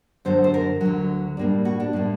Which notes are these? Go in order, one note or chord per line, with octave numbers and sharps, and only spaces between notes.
F#2 D3 F#3 C5
C5
A#4
D2 D3 F#3
A2 G3 A#3 D4
F#4
D4
A2 G3 A#3 D4